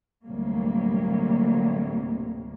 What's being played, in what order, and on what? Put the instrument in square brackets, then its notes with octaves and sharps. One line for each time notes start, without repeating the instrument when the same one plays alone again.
[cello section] D2 A2 C3 F#3 G3 A#3